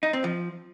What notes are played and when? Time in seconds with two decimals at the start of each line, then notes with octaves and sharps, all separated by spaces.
0.03 D#4
0.13 C4
0.24 F3